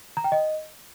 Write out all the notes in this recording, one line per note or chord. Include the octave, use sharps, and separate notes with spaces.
A#5
G5
D#5